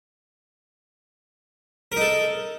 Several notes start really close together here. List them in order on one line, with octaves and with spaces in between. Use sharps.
A#4 D#4 A4